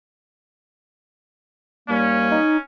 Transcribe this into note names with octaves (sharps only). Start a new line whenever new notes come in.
D#2 G3 A#3 C#4
D#4